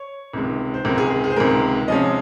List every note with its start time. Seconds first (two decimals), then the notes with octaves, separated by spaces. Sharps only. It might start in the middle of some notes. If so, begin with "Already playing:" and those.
Already playing: C#5
0.34 C#2 C3 D#3 G#3
0.74 C5
0.85 C#2 C3 D#3 G#3 A#4
0.98 G#4
1.10 G#4
1.24 G#4
1.30 C5
1.36 C#2 C3 D#3 G#3 A#4
1.87 C3 F3 G#3 C#4 D#5